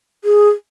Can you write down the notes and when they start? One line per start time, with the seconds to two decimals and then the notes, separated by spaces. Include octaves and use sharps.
0.24 G#4